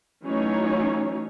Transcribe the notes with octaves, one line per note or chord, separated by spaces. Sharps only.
E3 F#3 A3 C#4 D#4 C#5